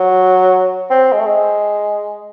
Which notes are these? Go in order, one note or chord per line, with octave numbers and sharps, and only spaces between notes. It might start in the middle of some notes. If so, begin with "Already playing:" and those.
Already playing: F#3
C4
G#3
A3
G#3